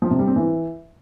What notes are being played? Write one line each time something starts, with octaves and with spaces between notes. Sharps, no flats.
F3
C3
G3
C4
E3